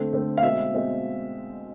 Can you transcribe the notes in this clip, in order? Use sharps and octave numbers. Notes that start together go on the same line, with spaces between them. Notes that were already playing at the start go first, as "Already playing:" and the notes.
Already playing: D3 A3 C4
D3 A3 C4
F5
B2 G#3 C4 E5
B2 G#3 C4